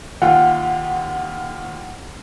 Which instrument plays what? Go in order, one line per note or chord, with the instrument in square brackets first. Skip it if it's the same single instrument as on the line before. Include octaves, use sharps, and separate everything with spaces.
[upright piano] D#2 F4 G5 [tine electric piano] F#5